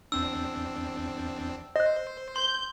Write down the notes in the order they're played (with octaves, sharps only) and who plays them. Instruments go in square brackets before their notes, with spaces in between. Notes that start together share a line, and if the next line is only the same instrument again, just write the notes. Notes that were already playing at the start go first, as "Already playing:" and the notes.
[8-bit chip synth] E2 C4 D4 [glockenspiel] E6
[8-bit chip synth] C5 [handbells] D#5 F#6
[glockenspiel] C6 [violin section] G6